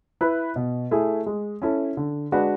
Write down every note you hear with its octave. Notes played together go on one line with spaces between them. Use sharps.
E4 B4
B2
A3 E4 G#4
G#3
C#4 E4 A4
D3
G#3 D4 F#4 B4